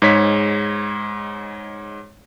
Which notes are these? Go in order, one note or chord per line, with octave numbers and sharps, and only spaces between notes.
G#2 G#3 C#5 B6